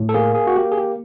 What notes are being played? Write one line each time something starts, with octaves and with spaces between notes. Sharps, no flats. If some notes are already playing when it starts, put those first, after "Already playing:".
Already playing: A2
A4
A#3 G#4
G#4
F#4
A#3 G4
G#4
G4